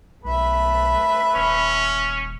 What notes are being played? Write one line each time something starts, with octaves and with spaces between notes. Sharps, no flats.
B1 A3 B4 E5
D#1 C#4